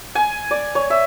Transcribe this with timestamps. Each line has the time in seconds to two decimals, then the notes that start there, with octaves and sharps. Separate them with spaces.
0.15 G#5
0.51 D5
0.75 C#5
0.90 E5